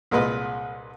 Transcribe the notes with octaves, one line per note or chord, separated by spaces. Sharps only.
C2 A#2 G#3 B4 D#5